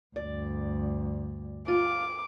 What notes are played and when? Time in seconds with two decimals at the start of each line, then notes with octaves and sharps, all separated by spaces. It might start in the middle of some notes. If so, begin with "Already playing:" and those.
0.16 D2 G2 D5
1.68 F4 D6